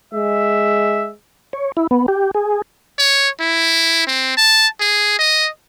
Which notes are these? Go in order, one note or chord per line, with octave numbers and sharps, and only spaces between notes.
G#3 E5
C#5
E4
B3
G4
G#4
C#5
E4
C4
A5
G#4
D#5